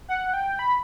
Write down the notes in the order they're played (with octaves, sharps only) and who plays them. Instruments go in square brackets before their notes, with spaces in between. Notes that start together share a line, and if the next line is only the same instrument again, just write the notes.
[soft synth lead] F#5
G5
B5